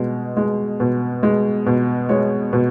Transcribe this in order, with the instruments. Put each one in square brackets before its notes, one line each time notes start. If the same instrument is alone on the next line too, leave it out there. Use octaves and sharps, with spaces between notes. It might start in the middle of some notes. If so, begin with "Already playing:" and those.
Already playing: [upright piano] B2 G#3
G#3
B2
G#3
B2
G#3 C#5
B2